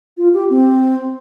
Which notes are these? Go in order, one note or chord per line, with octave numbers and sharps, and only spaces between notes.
F4
G4
C4